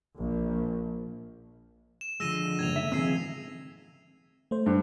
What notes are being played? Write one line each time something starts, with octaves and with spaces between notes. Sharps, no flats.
A#1
E7
D3 F3 G#3 E6 A#6 D#7
F#1 C#2 G#6 F7
A3 D#4 E5
C#2 D#3 F3 C4 G#4 E6 C7
A3 C5
G2